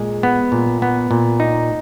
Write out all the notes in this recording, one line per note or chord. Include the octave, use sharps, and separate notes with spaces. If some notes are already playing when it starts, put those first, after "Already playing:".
Already playing: A#2 G#3
B3
A#2
B3
A#2
D#4